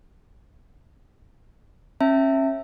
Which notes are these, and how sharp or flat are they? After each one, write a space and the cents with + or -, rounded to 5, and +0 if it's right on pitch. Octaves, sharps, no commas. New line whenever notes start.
C#4 -35 E5 +0 A5 +45